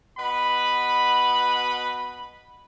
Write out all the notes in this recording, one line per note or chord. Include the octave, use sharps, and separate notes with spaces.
B2 B4 D#5 F#5 B5